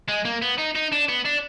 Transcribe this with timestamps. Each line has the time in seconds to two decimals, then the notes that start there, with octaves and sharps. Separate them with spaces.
0.08 G#3
0.25 A#3
0.42 B3
0.58 D#4
0.75 D#4
0.92 D4
1.08 B3
1.25 D4